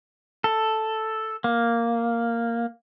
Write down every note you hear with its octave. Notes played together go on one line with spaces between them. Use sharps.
A4
A#3